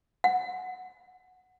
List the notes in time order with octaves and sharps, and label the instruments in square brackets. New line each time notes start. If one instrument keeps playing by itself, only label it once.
[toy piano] F#5